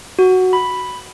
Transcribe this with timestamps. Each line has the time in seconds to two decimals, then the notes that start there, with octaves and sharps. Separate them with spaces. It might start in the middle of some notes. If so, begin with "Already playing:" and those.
0.19 F#4
0.53 B5